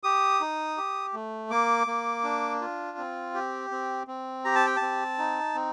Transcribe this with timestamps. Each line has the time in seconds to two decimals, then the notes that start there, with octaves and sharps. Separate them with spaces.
0.04 G4 D#6
0.41 D#4
0.77 G4
1.13 A3
1.50 A#3 D6
1.87 A#3
2.24 D4
2.61 F4
2.98 C4
3.35 G4
3.71 C4
4.07 C4
4.45 G4 A#5
4.55 A5
4.66 G5
4.76 A5
4.81 C4
5.18 D#4
5.55 C4